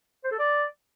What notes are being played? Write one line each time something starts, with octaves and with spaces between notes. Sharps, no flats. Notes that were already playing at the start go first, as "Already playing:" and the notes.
C5
A4
D5